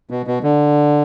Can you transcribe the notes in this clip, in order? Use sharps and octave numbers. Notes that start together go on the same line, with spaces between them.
B2
B2
D3